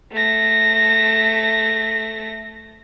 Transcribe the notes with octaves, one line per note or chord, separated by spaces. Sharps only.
A3 A#6